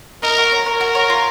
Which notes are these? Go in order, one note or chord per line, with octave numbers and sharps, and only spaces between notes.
D#4 A#4
F#4
C#5
A#4 C#5
F#4
C#5
F4